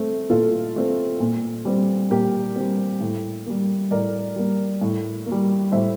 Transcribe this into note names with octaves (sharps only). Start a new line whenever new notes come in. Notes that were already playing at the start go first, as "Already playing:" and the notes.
Already playing: A3 C4
A#2 F4 A4
A3 C4
A#2
G3 C4
A#2 G4 A#4
G3 C4
A2
G3 A#3
A2 A#4 D5
G3 A#3
A2
A#3
G3
A2 C5 E5